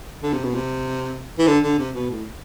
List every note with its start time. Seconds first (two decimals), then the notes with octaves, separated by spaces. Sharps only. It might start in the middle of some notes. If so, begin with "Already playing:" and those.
0.23 D3
0.33 C3
0.44 B2
0.55 C3
1.38 E3
1.47 D3
1.63 D3
1.79 C3
1.95 B2
2.10 A2